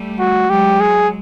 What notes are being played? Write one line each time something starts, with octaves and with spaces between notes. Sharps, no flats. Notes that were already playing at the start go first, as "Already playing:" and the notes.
Already playing: G3 A3
F#4
F#3 G#3 G4
G#4